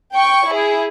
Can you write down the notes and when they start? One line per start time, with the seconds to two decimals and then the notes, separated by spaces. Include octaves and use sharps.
0.14 G5 C#6
0.47 E4 G#4